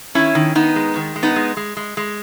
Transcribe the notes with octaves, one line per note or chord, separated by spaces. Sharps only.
D#3 C#4 E4
D#3
D#3 B3 D#4
G#3
D#3
G#3
B3 D#4
G#3
G#3
G#3
G#3